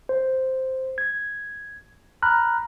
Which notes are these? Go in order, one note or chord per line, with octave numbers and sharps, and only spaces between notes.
C5
G#6
A#5 B5 F6 F#6